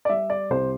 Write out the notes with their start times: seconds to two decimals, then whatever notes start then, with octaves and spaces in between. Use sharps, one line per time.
0.05 D5
0.09 G3 E5
0.30 D5
0.50 C2 C5